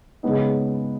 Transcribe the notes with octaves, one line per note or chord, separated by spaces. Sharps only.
C#3 G#3 B3 D#4